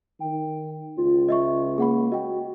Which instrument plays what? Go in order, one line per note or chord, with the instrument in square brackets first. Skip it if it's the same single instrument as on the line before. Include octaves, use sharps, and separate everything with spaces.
[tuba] D#3 [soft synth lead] G5
[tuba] C#2 [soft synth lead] F4
[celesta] D#5 E5 C#6
[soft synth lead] A#3 [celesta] G#4 F#5 B5
[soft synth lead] F#4 [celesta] D#5 G5